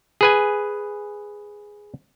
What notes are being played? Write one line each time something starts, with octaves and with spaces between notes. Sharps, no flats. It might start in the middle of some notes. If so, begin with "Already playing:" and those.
G#4 B4 G#5